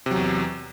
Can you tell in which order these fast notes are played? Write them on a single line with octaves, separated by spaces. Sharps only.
C3 F#3 E2